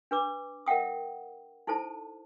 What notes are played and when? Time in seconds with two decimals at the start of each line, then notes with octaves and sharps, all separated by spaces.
0.11 D4 B4 D6
0.66 A#4 E5 F#5 G5 D#6
1.67 D#4 E4 A4 C5 A5